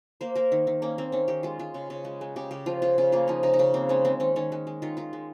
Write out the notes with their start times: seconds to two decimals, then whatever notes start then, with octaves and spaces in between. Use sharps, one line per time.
0.21 A#3 C5
0.35 A#3 A#4
0.52 D#3
0.67 D#3
0.82 A#3 C#4
0.98 A#3 C4
1.12 D#3 C#4
1.28 D#3 G4
1.43 G#3 F4
1.59 G#3 F4
1.74 C#3
1.90 C#3
2.05 G#3
2.21 G#3
2.36 C#3 G4
2.51 C#3 G4
2.66 F3 F4
2.82 C#3 F4
2.98 C#3 F4
3.12 A#3 F4
3.28 F3 D#4
3.43 C#3 D#4
3.54 D#4
3.59 C#3 C#4
3.74 A#3 C4
3.89 G#3 C#4
4.05 G#3 C4
4.20 D#3 C#4
4.36 D#3 C#4
4.52 G#3
4.67 G#3
4.82 D#3 F4
4.97 D#3 F4
5.13 G#3